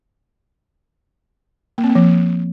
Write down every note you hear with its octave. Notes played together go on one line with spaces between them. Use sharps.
A#3
C4
A#3
F3